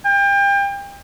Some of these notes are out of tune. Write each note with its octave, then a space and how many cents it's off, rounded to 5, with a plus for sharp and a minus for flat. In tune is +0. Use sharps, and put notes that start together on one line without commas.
G5 +30